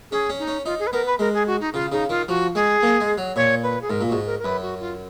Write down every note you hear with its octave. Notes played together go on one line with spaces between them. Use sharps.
C#4 G#4
C#4
D#4
C#4
D#4 F4
G#4
B4
B3 A#4
B4
G#3 A#4
G#4
F#4
D#4
C#3 F4
C#3 D#4
D#3 F4
F3 F#4
G#3 G#4
A#3
G#3
F#3
A#2 C#5
B4
G#4
G#2 A#4
A#2
G#2 F#4
A#4
A#4
F#2 B4
F#4
F4